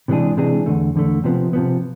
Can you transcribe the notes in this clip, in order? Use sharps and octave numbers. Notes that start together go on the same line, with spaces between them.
C3 E3 G#3 D4 G#4
C3 E3 G#3 D4 G#4
E2 D3 A3
E2 D3 A3
C3 F3 B3
C3 F3 B3